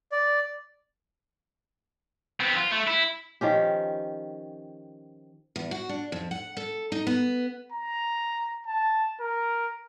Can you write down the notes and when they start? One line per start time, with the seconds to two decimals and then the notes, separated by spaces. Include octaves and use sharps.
0.12 D5
2.40 B3 C4
2.56 F4
2.71 A3
2.87 E4
3.41 D#3 F3 C#4 G4
5.56 E2
5.71 F#4
5.89 D4
6.12 F2
6.31 F#5
6.57 A4
6.92 D#4
7.07 B3
7.72 A#5
8.67 A5
9.21 A#4